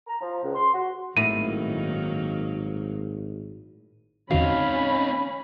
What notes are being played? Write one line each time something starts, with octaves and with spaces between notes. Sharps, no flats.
A#5
F3
C#2
C6
F#4
G#1 A2 D#3 F#3 A#3 D#7
E2 D3 C4 C#4 D#4 F#4 F5 B5